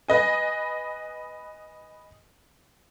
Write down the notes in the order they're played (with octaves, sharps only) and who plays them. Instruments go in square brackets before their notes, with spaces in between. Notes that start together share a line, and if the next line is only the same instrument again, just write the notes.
[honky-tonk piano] B4 D#5 G#5